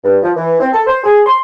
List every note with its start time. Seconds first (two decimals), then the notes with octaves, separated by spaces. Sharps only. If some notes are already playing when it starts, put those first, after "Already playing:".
0.04 G2
0.23 F3
0.36 E3
0.60 C4
0.73 A4
0.87 C5
1.04 G#4
1.26 C6